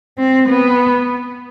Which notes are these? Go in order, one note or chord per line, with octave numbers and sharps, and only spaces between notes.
C4
B3